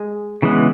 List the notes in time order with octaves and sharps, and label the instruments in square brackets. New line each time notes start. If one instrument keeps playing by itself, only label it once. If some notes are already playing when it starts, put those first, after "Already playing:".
Already playing: [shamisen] G#3
[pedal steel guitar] C#3 E3 G#3 B3